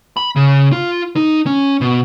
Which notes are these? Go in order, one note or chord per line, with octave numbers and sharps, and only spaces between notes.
B5
C#3
F4
D#4
C#4
B2